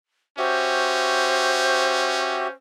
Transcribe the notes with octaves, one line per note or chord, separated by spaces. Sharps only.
C#4 F#4 G4 C5 E5